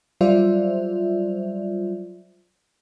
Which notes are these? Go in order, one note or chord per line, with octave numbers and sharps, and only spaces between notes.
F#3 G3 F4 C5 D5 E5